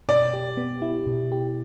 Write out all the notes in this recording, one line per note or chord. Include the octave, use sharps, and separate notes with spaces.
B2 D5
G4
B3
E4
B2
G4